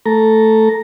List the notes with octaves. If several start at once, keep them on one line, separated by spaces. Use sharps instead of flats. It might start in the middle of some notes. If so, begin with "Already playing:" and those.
A3 A4 A#5